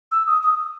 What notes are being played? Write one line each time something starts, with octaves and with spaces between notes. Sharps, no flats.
E6
D#6
D#6